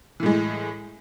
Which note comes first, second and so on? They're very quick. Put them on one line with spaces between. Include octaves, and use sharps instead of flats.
E3 A2 G#3